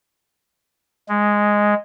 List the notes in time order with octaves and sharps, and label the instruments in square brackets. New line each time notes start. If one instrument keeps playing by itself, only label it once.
[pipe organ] G#3